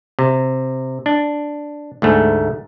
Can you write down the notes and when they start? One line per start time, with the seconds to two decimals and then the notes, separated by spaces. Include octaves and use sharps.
0.19 C3
1.06 D4
2.02 D2 G#2 A3